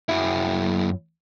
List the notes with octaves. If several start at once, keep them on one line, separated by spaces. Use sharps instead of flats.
F#2 E4